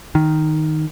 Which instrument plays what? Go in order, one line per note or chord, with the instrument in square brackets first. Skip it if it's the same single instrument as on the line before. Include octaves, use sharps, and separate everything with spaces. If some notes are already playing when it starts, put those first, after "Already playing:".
[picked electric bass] D#3